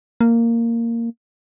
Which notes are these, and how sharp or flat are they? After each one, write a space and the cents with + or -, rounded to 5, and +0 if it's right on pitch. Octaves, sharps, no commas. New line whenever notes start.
A#3 -10